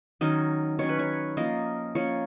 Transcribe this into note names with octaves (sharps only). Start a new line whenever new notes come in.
D#3 F#3 C#4 D#5
D#3 F#3 C#4 C#5
B4
C#5
F3 A#3 C#4 D#5
F3 A#3 C#4 C#5